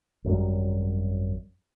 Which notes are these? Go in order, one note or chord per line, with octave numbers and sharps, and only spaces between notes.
G#1 F#2 F#3 G3